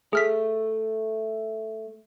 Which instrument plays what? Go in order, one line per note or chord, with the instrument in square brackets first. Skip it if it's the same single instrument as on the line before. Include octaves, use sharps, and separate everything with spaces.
[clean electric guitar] A3 [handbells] G#4 F6 B6